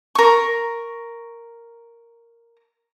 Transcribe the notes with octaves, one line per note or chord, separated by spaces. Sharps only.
A#4 C#6